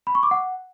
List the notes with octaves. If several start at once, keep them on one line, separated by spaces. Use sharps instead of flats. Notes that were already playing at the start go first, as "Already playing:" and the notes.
B5
C#6
D6
F#5